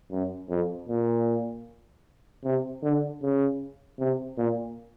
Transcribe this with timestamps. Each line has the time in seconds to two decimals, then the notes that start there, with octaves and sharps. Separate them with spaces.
0.11 F#2
0.50 F2
0.89 A#2
2.44 C3
2.83 D3
3.22 C#3
3.99 C3
4.38 A#2